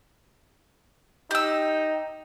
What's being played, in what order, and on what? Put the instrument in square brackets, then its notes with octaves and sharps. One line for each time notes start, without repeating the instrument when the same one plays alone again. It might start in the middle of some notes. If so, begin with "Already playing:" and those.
[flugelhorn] D#4 [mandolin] G4 E6